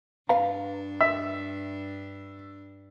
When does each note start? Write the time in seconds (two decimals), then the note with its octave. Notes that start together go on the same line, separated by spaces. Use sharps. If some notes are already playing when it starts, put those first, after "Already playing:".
0.29 G2 D4 B4 F5 A#5
1.01 E5